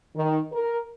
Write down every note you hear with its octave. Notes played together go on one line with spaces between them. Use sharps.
D#3
A#4